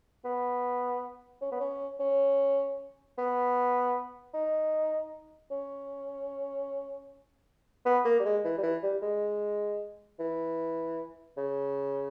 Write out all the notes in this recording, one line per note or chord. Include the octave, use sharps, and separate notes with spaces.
B3
C#4
B3
C#4
C#4
B3
D#4
C#4
B3
A#3
G3
G#3
E3
G3
E3
G3
G#3
E3
C#3